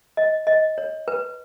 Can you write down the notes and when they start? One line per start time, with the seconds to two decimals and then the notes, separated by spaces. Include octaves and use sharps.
0.17 D#5
0.47 D#5
0.78 C#5
1.08 B4